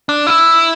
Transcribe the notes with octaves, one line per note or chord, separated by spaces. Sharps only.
D4
E4